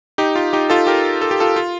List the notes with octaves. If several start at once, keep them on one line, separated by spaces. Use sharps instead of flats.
D#4 G4
F4
D#4 G4
F4 A4
G4 A#4
A4
G4
F4 A4
F4